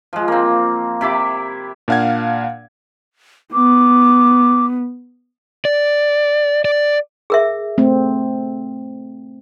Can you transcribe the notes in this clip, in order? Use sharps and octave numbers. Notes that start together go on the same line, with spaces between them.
F3 G#3
A#3 C4
C3 E4 B5 D6
A#2 D4 F5 F#5 G#6
B3 D6
D5
D5
G#4 A#4 E5
A3 C4